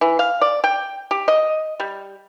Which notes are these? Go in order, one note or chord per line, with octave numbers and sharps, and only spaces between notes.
E3
F5
D5
G5
G4
D#5
G3